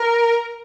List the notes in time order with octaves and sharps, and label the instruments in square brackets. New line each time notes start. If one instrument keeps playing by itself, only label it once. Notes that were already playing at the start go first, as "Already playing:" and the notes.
Already playing: [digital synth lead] A#4